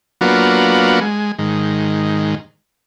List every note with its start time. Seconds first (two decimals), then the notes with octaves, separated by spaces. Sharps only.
0.21 F#3 A#3 B3 D4 F4 F#4
1.01 G#3
1.39 G#2 D#3